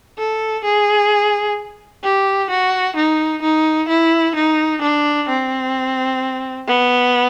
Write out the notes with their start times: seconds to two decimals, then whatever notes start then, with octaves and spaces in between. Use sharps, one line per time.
0.18 A4
0.64 G#4
2.04 G4
2.50 F#4
2.96 D#4
3.42 D#4
3.88 E4
4.35 D#4
4.81 D4
5.29 C4
6.67 B3